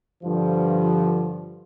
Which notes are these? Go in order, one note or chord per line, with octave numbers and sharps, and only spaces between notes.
G2 D3 F3